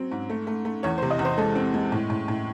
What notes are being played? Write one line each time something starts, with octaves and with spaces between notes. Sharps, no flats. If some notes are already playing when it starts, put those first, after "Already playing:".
Already playing: F#3 C4
G#2
A3
A3
A3
E2 C#5
C5
C3
D#5
E2
C5
G#3 A4
C4
G#3
A2
A2
A2